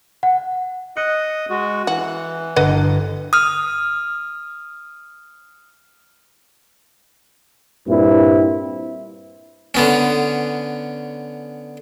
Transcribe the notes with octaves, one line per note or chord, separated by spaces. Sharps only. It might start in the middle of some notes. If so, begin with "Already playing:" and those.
F#5
D#5 F#6 C#7
G#3 F#4
E3 F#4
G1 B4 D#5 F#5
D#6 F6
G2 A#2 C4 E4
D3 B3 C#4